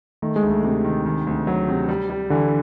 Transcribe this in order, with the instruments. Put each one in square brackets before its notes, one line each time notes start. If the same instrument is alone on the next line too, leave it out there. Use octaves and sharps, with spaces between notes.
[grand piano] D#3 [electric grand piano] A3
[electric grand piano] G#3
[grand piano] D2
[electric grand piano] A3
[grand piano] C3 [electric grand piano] G#3
[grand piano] D#3
D#3
D2
F#3
C3
G3
G3
[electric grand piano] D3 [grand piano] E3